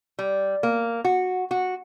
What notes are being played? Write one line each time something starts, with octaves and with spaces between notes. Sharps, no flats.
G3
A#3
F#4
F#4